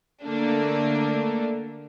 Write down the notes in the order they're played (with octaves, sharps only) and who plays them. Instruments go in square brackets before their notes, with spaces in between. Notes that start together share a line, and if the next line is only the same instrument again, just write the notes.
[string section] D3 A3 A#3 D4